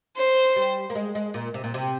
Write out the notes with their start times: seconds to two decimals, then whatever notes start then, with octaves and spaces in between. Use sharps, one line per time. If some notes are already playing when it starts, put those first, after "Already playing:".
0.17 C5
0.56 G3
0.90 A#3
0.95 G#3
1.15 G#3
1.34 A#2
1.54 C3
1.64 A#2
1.74 C3